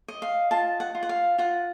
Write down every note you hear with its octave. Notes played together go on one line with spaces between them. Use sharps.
D#5
F5
F4 A5
F#5
F4
F#5
F5
F4 F#5